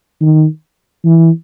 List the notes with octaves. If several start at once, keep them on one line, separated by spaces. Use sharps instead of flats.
D#3
E3